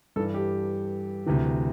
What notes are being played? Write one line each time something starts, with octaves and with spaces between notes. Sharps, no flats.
G2 E3 A4
G4
D2 C3 E3